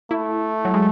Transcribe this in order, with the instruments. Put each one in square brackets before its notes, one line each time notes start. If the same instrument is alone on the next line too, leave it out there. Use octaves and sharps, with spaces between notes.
[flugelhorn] A3 [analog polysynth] E4
[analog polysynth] F#3
G#3